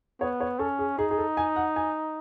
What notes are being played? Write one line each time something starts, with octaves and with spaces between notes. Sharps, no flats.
B3 C#5
C#5
C#4 A4
G#4
D#4 G#4
G#4
A4
G#5
F#5
G#5